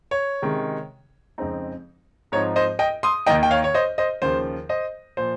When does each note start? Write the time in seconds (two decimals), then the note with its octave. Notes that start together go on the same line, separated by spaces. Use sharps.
0.11 C#5
0.42 C3 D#3 G#3 C#4
1.38 F2 C#3 G#3 C4 D#4
2.32 G#2 F3 C4 D#4 C#5
2.56 C5 D#5
2.79 D#5 G5
3.03 C6 D#6
3.26 D#2 D#3 A#3 D#4 D#5 G5
3.43 G5
3.51 C#5 F5
3.64 C#5
3.74 C5 D#5
3.98 C5 D#5
4.22 D#2 C#3 F3 C5
4.69 C5 D#5
5.17 A#2 F3 C5